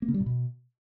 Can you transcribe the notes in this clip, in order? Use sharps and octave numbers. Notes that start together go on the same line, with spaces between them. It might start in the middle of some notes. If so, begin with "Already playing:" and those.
A#3
C#3
G3
A#2
B2